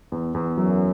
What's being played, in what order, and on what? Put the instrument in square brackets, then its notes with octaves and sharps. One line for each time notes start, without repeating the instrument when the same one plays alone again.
[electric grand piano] E2
E2
[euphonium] F#2 [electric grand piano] F#3